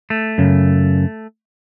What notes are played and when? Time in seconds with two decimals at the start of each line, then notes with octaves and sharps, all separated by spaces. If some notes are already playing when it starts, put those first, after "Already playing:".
0.10 A3
0.38 F#2 C#3